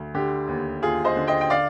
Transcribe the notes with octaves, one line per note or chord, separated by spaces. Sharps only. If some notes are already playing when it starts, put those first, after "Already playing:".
Already playing: D2
D3 G4
D#2
D#2 F4 G#4
C5 D#5
D3
D#5 G5
G5
D5 F5